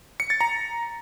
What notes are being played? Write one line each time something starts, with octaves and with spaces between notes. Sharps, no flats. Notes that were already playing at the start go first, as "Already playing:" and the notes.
C#7
A6
A#5